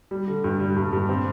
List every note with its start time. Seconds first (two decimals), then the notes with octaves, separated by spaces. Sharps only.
0.11 G3
0.28 D3
0.44 G2
0.60 G3
0.76 G2
0.93 G2
1.09 C4